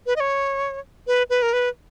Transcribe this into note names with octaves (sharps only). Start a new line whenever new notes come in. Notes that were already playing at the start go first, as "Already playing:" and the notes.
B4
D#5
C#5
B4
B4
A#4
B4